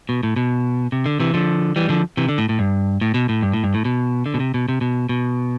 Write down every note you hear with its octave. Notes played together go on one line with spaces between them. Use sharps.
B2
A2
B2
C3
D3
C3 E3
D3 F3
E3 G3
D3 F3
C3 E3
D3
A2
A2
G2
A2
B2
A2
G2
A2
G2
A2
B2
D3
B2
C3
B2
C3
B2
B2